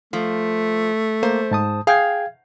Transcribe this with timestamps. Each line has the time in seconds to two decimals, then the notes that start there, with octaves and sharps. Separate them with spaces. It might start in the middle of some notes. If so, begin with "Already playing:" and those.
0.13 F3 A3
1.23 A#3 C5
1.51 G#2 A5 D#6
1.87 G#4 F5 G5 G#6